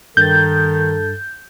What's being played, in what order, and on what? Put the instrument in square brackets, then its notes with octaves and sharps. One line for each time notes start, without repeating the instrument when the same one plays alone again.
[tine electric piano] G2 A6 [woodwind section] D#3 [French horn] A4 [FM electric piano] G6